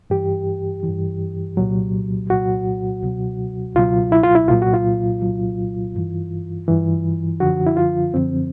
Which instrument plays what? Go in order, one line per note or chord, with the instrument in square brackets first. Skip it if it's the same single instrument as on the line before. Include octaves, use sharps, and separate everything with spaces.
[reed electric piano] G2 E3 G4
E3
G2
C2 A#2 F#3
C2 A#2 F#3 F#4
C#2 B2 F#3
C#2 B2 F#3 F4
E4
F4
E4
C2 A#2 F#3 F4
F#4
F4
C2 A#2 F#3
G2 E3
G2 E3
F#2 D3 F3 F#4
E4
F4
F#2 D3 F3 C4